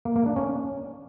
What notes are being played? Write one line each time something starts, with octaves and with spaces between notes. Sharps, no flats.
A#3
A#3
D4
C#4